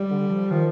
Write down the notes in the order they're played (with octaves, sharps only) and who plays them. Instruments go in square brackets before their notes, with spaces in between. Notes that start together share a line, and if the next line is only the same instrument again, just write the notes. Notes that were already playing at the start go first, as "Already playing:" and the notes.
Already playing: [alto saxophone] G3
[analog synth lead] D3
F3
[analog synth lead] D#3 [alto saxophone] F3